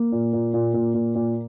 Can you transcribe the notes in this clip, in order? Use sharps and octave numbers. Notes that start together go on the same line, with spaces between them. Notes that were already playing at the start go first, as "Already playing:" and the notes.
Already playing: A#3
A#2
A#2
A#2
A#2
A#2
A#2